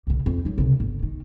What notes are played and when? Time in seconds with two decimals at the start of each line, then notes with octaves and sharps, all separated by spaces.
0.07 C2 C#3
0.26 F2
0.45 F#3 D#4
0.58 C2 C#3
0.80 G1
1.03 D#3